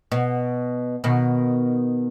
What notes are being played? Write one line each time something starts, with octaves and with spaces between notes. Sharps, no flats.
B2
B2 D#3